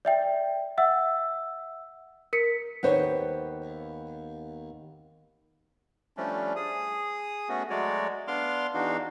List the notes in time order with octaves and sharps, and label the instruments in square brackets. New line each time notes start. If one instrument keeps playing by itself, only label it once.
[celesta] D5 E5 G5
E5 F#5 E6
A#4 B6 C#7
[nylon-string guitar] D#2 B3 C5 C#5
[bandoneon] F3 G3 A3 C#4 D4
G#4 D#6
A3 B3 C#4 F#4
F#3 G#3 A3 F#4 C#5 D5
B3 D4 F5 C6 D6 F6
E2 E3 D4 D#4 F#4 F5